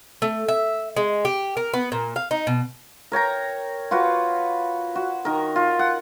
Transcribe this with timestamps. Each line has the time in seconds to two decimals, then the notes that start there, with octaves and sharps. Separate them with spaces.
0.22 A3
0.48 E5
0.97 G#3
1.25 G4
1.57 A#4
1.73 B3
1.92 A#2
2.16 F5
2.31 D#4
2.47 B2
3.12 A#4 C#5 G5 A#5
3.91 F4 F#4 B4
4.96 F#4
5.25 D#3 A#4
5.56 F4
5.79 F#5